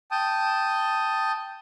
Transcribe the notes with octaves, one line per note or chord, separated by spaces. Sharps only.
G5 A5 D#6